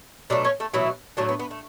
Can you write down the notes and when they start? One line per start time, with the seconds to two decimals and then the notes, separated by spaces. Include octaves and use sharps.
0.30 B2 F#3 A3 D4 D5
0.45 C#4 C#5
0.60 A3 A4
0.73 B2 E3 F#3 A3 E4
1.17 A2 D3 F#3 A3 D4
1.29 B3
1.39 B3
1.51 A3